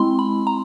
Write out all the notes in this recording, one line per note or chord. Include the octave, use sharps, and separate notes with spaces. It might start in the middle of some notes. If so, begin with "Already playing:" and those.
Already playing: G#3 C4 E4 C6
B5
A#5